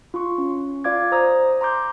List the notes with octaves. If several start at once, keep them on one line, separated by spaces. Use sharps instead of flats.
F4 C6 C#6
C#4
F4 D5 F5 D6 G#6
C5 A#5 D#6
A#5 C6 D6 G6